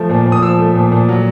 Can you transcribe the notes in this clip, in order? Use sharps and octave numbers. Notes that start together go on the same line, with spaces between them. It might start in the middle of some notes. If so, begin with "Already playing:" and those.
Already playing: F3 A3
A#2
A#2
D#6
F3 E6
A3
A#2
A#2
F#3